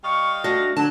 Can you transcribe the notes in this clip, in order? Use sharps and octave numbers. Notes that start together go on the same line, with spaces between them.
G3 D#5 F5 C#6
A3 D4 F#4 A#6
D3 F#3 A5